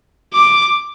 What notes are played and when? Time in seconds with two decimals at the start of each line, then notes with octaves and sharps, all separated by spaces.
0.33 D6